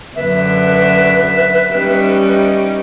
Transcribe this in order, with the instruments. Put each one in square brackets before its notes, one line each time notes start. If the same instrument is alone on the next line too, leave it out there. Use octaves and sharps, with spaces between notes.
[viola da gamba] F#2 D3 [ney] B4 [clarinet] E5
[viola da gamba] G3 C#4 D#4